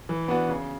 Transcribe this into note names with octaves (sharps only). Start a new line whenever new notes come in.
E3
B3 D4 F#4
C#3